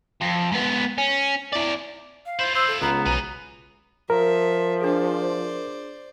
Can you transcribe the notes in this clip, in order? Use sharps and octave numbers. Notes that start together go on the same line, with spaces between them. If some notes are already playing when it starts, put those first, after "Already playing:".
F2
G#2 B3
C#4
E4 D5
F5
E4 F4 C5
C5 E6
A4
C#2 B3 A#5
B1 B4 G#5
F3 A#4 E5
D4 G#4 C5 D5